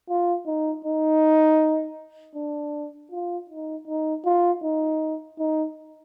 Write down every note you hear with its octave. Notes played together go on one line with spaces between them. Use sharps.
F4
D#4
D#4
D4
F4
D#4
D#4
F4
D#4
D#4